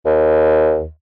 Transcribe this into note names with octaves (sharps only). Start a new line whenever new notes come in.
D#2